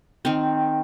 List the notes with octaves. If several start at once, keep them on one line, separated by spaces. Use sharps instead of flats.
D#3 C4